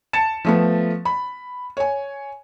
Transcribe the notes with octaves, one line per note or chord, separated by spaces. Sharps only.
A5 A6 C#7 E7
F3 A3 B3
B5
C#5 G#5